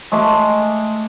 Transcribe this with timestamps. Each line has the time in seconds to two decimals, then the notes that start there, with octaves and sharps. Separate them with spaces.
0.12 G#3 A3 E5 D6